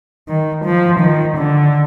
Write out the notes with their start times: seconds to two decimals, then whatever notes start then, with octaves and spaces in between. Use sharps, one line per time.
0.28 D#3
0.65 F3
1.00 D#3
1.38 D3